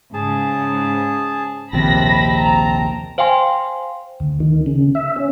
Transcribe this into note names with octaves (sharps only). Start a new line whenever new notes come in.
G#2 C#3 G#4 A5
A#1 D#2 C3 C4 A5 B5 A#6
A#5
C5 F5 G5 G#5 C6
D2
D#3
C#3
E5
C#4